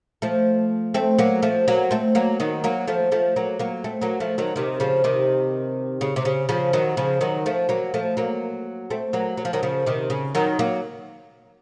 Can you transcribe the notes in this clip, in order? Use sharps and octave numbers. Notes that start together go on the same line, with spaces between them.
F3 A3
A3 C4
F#3 A#3
F3 A3
F#3 A#3
A3 C4
F#3 A#3
D#3 F#3
F#3 A#3
F3 A3
F3 A3
F#3 A#3
F#3 A#3
A3 C4
F#3 A#3
F3 A3
D#3 F#3
C3 D#3
C#3 F3
C3 D#3
C#3
C3
C#3
C#3 F3
D#3 F#3
C#3 F3
D#3 F#3
F3 A3
F#3 A#3
F3 A3
F#3 A#3
A3 C4
F#3 A#3
F#3
F3
D#3 F#3
C#3 F3
C3 D#3
C#3
D#3 F#3
F#3 A#3